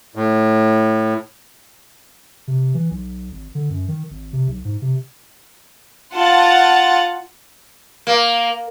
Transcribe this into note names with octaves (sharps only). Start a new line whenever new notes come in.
A2
C3
E3
B1
G#1
D3
F#2
D#3
G#1
C3
B1
G#2
C3
F4 F#5 A5 A6
A#3